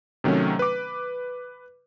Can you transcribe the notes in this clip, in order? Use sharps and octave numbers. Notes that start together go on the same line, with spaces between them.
C3 D#3 F#3 A3 C#4
B4 D6